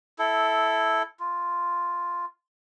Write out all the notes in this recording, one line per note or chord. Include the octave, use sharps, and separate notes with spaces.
E4 A4
F4